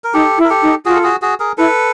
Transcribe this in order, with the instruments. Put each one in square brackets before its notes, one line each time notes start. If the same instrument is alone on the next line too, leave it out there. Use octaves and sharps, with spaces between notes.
[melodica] A#4
[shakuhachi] D#4 [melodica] G4 A4
[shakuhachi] E4
[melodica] A#4
G4 A4
[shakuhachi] D#4
[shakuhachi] F4 [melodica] F#4 G#4
[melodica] A4
F#4 G#4
F#4 G#4
G#4 A#4
[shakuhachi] E4 [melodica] A4 B4